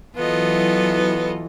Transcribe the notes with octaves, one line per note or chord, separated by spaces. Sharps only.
E3 F#3 B3 F4 A4 D#5